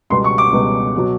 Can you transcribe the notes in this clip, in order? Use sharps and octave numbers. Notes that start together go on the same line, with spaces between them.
C#2 B2 G3 B3 C6
C#6
D6
C#2 B2 G3 B3
B2 F#3